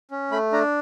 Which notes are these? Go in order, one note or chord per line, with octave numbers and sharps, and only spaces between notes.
C#4
A3 B5
D4 A#5